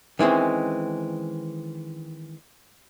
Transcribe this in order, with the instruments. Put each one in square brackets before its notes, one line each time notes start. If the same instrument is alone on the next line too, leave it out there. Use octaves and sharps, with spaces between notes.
[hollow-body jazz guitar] D#3 E3 G#3 C4 C#4